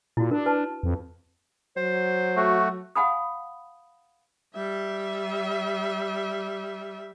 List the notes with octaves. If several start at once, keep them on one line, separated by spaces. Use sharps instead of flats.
A#2 E4 F#4
D4 A#4
B4 A5
F2
F#3 C5
A3 F#4
F5 F#5 G#5 B5 D#6
G3 E5